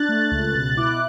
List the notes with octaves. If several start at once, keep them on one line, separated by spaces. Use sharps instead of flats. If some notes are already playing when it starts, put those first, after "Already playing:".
Already playing: D4 F#6 A6
A3
C#2
B2
E4 D6 F#6